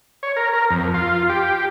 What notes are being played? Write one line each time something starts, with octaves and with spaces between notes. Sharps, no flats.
C#5
A#4
A#4
F2
F4
G4